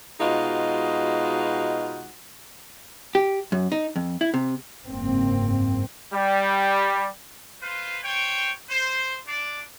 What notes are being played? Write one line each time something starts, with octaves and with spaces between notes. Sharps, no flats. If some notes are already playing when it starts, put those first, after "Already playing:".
B2 G#3 D#4 F4 F#4
G4
F#2
D#4
F2
E4
C3
F#1 G#2 A#3 C4
G3
F4 B4 C5 F5
C5 C#5 G5
C5
D4 D5